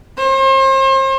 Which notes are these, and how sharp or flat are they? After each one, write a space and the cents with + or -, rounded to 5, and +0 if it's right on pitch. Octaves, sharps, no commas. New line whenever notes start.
C5 +40